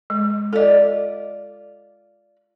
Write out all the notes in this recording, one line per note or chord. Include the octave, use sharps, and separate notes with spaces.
G#3
F4 A4 D5 D#5